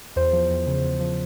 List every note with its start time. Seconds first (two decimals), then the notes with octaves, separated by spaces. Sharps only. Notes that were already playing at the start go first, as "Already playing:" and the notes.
0.16 E2 C5
0.33 F3
0.50 E2
0.67 C#3
0.83 E2
1.00 F3